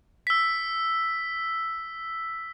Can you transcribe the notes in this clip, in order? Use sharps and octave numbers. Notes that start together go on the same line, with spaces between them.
E6 B6